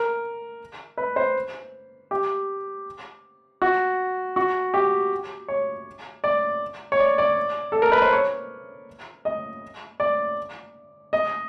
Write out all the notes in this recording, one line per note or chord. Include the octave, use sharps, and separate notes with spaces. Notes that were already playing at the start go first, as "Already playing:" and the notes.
Already playing: A#4
B4
C5
G4
F#4
F#4
G4
C#5
D5
C#5
D5
D5
A4
A#4
B4
C5
C#5
D#5
D5
D#5